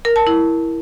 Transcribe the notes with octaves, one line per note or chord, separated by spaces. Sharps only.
A#4
A5
E4